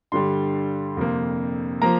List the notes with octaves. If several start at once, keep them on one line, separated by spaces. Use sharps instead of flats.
G2 D3 G3 C6
F2 C3 A#3
F3 A#3 A#5